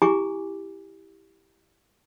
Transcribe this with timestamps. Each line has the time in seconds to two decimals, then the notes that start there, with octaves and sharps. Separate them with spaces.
0.02 E4 G4 G#5 A#5 D6